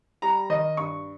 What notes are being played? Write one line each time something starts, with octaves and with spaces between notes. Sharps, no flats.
G3 A#5
D#3 D#5
G2 C#6